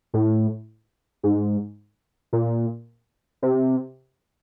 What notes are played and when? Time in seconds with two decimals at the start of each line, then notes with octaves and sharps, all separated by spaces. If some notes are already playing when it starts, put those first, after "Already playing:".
0.14 A2
1.23 G#2
2.33 A#2
3.42 C3